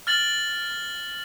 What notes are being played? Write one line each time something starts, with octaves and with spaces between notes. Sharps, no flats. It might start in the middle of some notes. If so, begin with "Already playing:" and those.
F6 A6 F#7